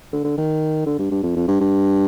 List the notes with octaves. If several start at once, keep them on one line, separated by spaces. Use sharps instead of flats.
D3
D3
D#3
D3
G2
G2
F2
F2
G2
G2